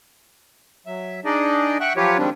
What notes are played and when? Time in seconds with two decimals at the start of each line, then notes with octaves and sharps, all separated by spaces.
0.86 F#3 E5
1.25 D4 D#4 G#4 D5 D#5
1.80 E5 F#5 G5 C#6 F#6
1.97 F3 F#3 F4 G4 B4 C#5
2.18 G#2 D#3 F3 G3 C4 D4